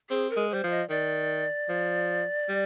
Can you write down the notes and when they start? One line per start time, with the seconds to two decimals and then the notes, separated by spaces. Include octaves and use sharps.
0.10 C4 G#4
0.30 A#4
0.37 G#3
0.50 G3 C5
0.64 F3
0.70 D#5
0.89 D#3 D5
1.69 F3
2.48 G3